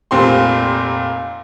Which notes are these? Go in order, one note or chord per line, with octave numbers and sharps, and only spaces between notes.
F1 A#2 C4 G4 C6